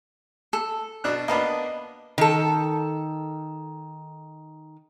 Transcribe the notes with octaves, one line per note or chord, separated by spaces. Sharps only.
A4
B2 D4 F#6
A#3 B3 D4 D#5 A5 B5
D#3 A4